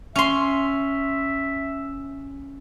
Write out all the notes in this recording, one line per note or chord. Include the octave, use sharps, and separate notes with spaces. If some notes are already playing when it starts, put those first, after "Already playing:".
C#4 E5 C6